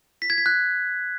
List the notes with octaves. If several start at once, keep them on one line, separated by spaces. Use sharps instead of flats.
B6
G#6
B6
F#6